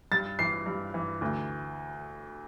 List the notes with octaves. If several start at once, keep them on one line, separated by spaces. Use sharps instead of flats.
G2 A6
E3 C7
G2
E3
D2